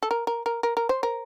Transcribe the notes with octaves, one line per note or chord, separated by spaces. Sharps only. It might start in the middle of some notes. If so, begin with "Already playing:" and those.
A4
A#4
A#4
A#4
A#4
A#4
C5
A#4